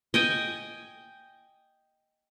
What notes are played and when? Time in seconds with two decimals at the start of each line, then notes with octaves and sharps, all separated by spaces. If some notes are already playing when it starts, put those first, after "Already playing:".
0.14 D#5 G5 G#5